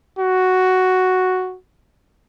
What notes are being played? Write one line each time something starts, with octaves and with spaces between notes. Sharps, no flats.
F#4